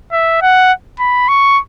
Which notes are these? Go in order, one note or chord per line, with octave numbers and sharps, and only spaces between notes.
E5
F#5
B5
C#6